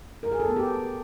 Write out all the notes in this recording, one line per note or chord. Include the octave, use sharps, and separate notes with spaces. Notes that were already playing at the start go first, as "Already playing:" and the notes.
A#4
G#4
A4
B3
G4